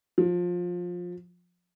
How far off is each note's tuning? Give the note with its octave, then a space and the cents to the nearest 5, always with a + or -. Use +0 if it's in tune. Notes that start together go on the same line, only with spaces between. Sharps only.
F3 +20